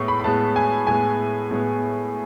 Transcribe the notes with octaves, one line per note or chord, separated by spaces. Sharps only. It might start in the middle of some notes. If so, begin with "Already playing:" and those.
Already playing: A2 G#3 B3 C#6
B5
B5
A2 G#3 B3 A5
G#5
A2 G#3 B3 G#5
A2 G#3 B3